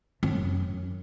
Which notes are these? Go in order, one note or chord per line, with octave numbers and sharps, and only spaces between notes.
F#2